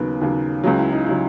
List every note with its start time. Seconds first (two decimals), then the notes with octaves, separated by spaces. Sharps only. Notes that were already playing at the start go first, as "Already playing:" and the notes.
Already playing: D#2 C#3 F#3 B3 B4
0.21 D#2 C#3 F#3
0.64 C#2 C#3 F#3
0.78 E4
0.92 D#4
1.06 C#3 F#3 E4